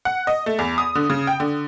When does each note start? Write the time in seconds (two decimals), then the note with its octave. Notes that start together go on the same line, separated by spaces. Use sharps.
0.05 F#5
0.27 D#5
0.46 A3
0.59 E2
0.78 D#6
0.95 D3
1.10 C#3
1.27 G5
1.40 D3